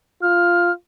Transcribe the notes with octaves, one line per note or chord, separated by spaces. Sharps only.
F4 F6